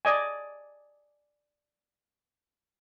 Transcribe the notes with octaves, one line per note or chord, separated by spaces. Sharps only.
D5 D#5 G#5